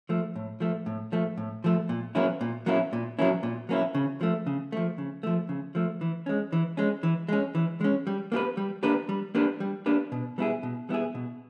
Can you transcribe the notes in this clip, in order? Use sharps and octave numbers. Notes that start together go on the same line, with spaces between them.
F3 A3
A2
F3 A3
A2
F3 A3
A2
F3 A3
A#2
F#3 A#3 C#4 E4
A#2
F#3 A#3 C#4 E4
A#2
F#3 A#3 C#4 E4
A#2
F#3 A#3 C#4 E4
C#3
F3 A3
C#3
F3 A3
C#3
F3 A3
C#3
F3 A3
E3
G#3 C#4
E3
G#3 C#4
E3
G#3 C#4
E3
G#3 C#4
G3
A#3 D4 G4 B4
G3
A#3 D4 G4 B4
G3
A#3 D4 G4 B4
G3
A#3 D4 G4 B4
B2
G3 B3 E4 G#4
B2
G3 B3 E4 G#4
B2